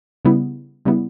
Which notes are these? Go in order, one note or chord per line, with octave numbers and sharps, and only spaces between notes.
C#3 G3 B3 E4
C#3 G3 B3 E4